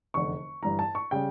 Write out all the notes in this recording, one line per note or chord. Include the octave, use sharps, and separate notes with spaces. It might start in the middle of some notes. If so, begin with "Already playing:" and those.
F1 E2 D3 C#6
G1 G2 E3 A#5
A5
C#6
C#3 G3 G5